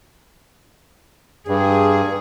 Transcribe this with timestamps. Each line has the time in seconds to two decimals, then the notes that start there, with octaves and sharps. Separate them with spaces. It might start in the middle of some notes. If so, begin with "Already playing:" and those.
1.48 G2 G#4